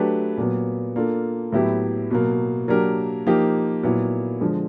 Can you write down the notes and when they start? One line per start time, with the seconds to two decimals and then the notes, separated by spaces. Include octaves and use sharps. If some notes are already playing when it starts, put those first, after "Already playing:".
Already playing: F#3 A3 D4 G4 B4
0.37 A#2 F#3 B3
0.96 A#3 D4 F4 A4
1.52 A2 F#3 B3 E4 G4
2.11 B2 F#3 A#3
2.68 F#3 A#3 D4 G4 A#4
3.26 F3 A#3 D#4 G4
3.83 A#2 F#3 B3 E4
4.41 D3 F3 G#3